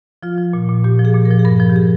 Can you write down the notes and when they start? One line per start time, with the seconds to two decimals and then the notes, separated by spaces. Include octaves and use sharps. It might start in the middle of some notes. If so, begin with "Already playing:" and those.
0.23 F3 F4
0.38 F3
0.53 A#2
0.69 A#2
0.84 A#2 G4
0.99 F3
1.05 G#4
1.14 A#2
1.25 A#4
1.30 F3
1.39 G#4
1.45 G2 A#4
1.60 F3
1.69 G4
1.76 G#4